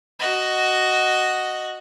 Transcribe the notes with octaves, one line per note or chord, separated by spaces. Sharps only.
F#4 D#5